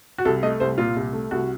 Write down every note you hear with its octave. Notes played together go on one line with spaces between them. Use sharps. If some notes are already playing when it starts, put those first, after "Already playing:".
F#4
C2 A4
A3 D#5
C2 C5
A#2 F4
C2
A3
C2 F#4